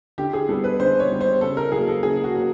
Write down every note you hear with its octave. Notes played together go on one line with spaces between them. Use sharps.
D3 G4
G#4
G3 B3 A4
B4
D3 C5
C#5
G3 B3
C5
C#3 A4
A#4
F#3 A#3 G#4
A4
C#3 G#4
F#4
F#3 A#3